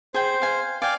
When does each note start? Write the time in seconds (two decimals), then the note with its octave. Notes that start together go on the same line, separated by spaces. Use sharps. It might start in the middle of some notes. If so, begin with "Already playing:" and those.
0.14 G#4 C5 G5
0.42 F5 G#5
0.82 D5 F5 G5 G#5